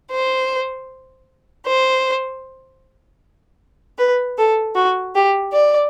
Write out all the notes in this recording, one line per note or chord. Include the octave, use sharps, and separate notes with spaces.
C5
C5
B4
A4
F#4
G4
D5